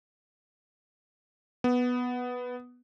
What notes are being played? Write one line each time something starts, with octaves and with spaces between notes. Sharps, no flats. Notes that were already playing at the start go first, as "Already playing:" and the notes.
B3